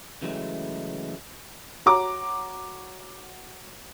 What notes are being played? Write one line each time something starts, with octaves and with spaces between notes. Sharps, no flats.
C#3 E3 F#3 G#3 A3
F#4 C#5 A#5 D6